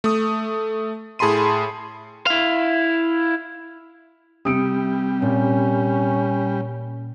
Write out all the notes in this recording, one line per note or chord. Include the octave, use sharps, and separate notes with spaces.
A3 D#6
A2 G#4 A5 B5 C6 D#7
E4 F5
C3 G3 D#6 E6 C#7 D7
A#2 C#4